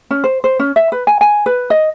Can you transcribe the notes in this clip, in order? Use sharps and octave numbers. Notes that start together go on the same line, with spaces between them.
C#4
C5
C5
C#4
E5
B4
G#5
G#5
B4
D#5